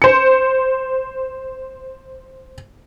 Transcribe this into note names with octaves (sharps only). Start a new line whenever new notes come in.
C5 C#7